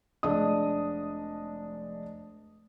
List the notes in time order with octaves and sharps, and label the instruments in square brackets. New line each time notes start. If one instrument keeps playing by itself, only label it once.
[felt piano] F1 G#3 D4 D#5 D#6